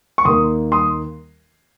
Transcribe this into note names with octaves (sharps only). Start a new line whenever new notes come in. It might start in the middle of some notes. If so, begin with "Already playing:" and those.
C#6
D#2 D#3 A#3 C6 D#6
C6 D#6